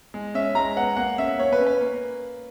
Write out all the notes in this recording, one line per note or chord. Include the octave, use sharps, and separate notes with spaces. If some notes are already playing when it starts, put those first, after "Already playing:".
G#3
C#4 E5
G#3 A#5
B3 F#5
A#3 F#5
C#4 E5
A#3 C#5
B4
C#4
B4
A#3